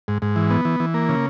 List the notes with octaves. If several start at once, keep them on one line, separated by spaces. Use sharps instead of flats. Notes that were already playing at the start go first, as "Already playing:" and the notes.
G#2
G#2
E3
B3
E3
E3
A#3
C#3